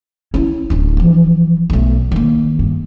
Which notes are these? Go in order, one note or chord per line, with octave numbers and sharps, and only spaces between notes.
C#4 E4
D1 D4
E3 F3
B1 A3
D#3 A#3
G2